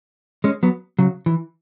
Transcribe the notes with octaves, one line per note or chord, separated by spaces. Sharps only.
G#3 C#4
F#3 B3
C#3 F#3
E3